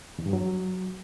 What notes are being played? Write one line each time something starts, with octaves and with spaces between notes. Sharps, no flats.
E2
G2
F#3